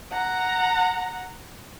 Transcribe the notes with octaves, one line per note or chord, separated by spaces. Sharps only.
F#5 A#5